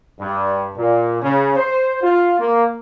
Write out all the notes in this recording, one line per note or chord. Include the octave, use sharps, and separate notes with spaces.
G2
A#2
C#3
C5
F4
A#3